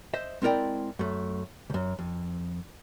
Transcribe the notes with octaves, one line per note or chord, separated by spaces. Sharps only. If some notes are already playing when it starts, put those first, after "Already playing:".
C5 D#5 E5
G#3 C4 E4 A#4 D5 G5
F#2 A3
C#2 F#2
F2